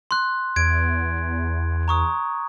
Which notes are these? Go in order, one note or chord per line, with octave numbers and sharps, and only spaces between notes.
C6 F#6
E2 G#6 D7
A#5 C#6 D#6